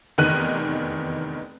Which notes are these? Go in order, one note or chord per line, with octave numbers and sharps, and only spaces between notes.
F1 E2 D#3 E3 F#6 D#7